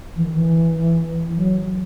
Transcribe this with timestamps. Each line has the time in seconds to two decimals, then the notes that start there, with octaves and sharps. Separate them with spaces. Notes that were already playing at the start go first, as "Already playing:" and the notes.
0.16 E3
0.24 D#3
0.33 E3
1.36 F#3